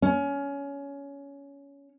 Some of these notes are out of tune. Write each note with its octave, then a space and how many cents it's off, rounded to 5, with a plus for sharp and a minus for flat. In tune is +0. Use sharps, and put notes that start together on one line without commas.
C#4 +20